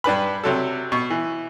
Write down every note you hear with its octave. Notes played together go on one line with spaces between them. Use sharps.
G2 D4 B4 B5
C3 F#3 A4
B2 C#6
E3